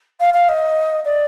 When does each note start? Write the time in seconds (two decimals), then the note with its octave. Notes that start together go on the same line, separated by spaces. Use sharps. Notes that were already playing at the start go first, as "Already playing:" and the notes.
0.20 F5
0.33 F5
0.48 D#5
1.05 D5